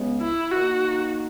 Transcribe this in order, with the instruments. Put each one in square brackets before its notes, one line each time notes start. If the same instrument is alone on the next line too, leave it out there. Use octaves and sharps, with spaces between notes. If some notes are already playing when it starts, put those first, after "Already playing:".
Already playing: [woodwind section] C#2 C#3 G#3 B3
[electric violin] E4
[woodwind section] D#3 A#3 D#4 [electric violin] F#4